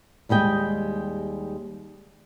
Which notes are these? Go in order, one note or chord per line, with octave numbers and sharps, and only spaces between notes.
D#2 G3 G#3 G5